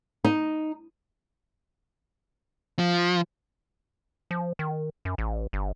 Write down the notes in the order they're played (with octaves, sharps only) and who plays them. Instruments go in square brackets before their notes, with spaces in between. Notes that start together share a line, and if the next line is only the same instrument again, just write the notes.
[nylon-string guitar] D#4
[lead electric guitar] F3
[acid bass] F3
D#3
F#2
A1
G1